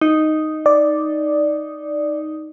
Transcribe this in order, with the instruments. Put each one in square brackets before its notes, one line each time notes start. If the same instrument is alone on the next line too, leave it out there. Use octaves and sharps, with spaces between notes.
[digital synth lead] D#4
[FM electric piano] D5